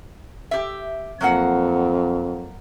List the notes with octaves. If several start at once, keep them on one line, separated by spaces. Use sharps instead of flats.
G4 E5
F2 F#3 A#3 F#5